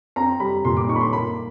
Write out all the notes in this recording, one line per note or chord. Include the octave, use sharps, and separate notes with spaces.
C4 A#5
G3 B5
A#2 C6
D6
D#4 C#6
B5
C6
A#3 B5